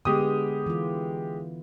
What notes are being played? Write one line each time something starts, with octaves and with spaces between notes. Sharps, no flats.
D3 G#3 B3 G4 D#6
E3 F4